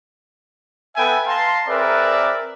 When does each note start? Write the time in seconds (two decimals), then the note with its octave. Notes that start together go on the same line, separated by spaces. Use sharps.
0.96 B3 A4 B4 E5 G5 G#5
1.26 F5 A5 A#5 C6
1.67 C4 G#4 A#4 B4 D5 E5